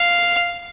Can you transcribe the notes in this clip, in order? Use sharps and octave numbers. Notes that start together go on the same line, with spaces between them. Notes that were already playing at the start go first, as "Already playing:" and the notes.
Already playing: F5